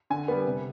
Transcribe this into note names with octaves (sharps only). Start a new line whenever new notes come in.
D3 G#5
G3 B3
C3